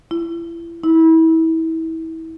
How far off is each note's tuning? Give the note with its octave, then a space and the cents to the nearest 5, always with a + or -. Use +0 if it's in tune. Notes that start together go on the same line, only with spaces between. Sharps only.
E4 +30
E4 -30